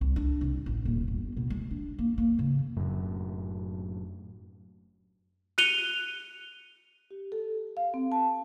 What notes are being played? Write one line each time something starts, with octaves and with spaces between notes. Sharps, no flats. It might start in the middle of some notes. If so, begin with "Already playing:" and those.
C2
D4
C2
A1
D#1
G1
B2
G#3
D4
A#3
A#3
C#3
F#1 F#2 A2
F#6 C#7 D#7 F7 G7
G4
A4
F5
C4
A5